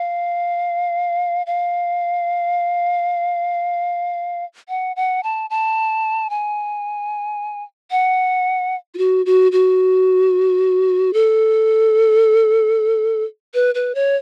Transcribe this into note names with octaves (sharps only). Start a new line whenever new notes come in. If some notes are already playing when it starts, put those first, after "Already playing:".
Already playing: F5
F5
F#5
F#5
A5
A5
G#5
F#5
F4
F#4
F#4
F#4
A4
B4
B4
C#5